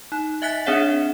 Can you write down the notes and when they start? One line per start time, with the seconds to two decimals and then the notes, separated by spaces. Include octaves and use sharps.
0.12 D#4
0.42 D#5 E5 G#5 F#6 A6 B6
0.66 C4 D4 G#4 C#5 E5 F#5